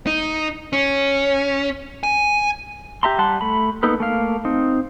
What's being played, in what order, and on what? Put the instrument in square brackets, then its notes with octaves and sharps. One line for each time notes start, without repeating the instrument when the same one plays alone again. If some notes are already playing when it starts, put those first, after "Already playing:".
[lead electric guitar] D#4
C#4
G#5
[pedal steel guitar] G4 E5 A#5 C6
G3 F#5 A5 C6
A3 B5
A#3 B3 D#4 A4 B4
A3 A#3 F5
C4 D#4